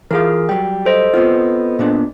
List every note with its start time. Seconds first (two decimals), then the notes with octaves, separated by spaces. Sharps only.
0.11 E3 F4 G#4 A#4 F5
0.49 F#3 G3 G5
0.85 A4 C5 D#5
1.14 B3 C4 F4
1.79 A#2 B3 D4